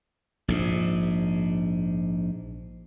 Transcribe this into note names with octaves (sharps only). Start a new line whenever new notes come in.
A#1 G#2